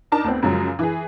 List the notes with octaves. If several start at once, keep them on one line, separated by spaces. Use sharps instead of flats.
D4 D#4 A#4 A5
D2 B3 C4
F#2 C#3 F3 F#3 G#3
E3 G#4